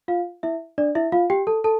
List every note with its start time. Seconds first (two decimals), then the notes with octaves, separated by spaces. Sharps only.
0.08 F4 F5
0.43 E4 E5
0.78 D4 D5
0.95 E4 E5
1.12 F4 F5
1.30 G4 G5
1.47 A4 A5
1.64 A4 A5